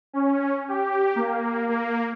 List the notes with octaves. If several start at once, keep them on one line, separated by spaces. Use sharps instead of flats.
C#4
G4
A#3
A#3